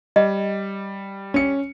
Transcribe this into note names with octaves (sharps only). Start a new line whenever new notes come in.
G3 D#5
C#4 C#7